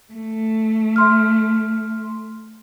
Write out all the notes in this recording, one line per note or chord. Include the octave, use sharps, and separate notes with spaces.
A3
E5 C6 F6